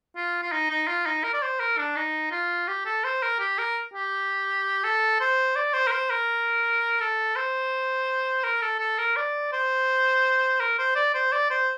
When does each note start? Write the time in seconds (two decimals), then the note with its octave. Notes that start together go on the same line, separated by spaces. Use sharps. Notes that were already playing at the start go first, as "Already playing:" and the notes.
0.16 F4
0.42 F4
0.52 D#4
0.70 D#4
0.88 F4
1.06 D#4
1.24 A#4
1.34 D5
1.42 C5
1.60 A#4
1.78 D4
1.96 D#4
2.32 F4
2.68 G4
2.86 A4
3.04 C5
3.22 A#4
3.40 G4
3.58 A#4
3.94 G4
4.84 A4
5.21 C5
5.56 D5
5.74 C5
5.87 A#4
5.92 C5
6.10 A#4
7.01 A4
7.36 C5
8.44 A#4
8.62 A4
8.80 A4
8.98 A#4
9.17 D5
9.53 C5
10.60 A#4
10.79 C5
10.96 D5
11.14 C5
11.32 D5
11.50 C5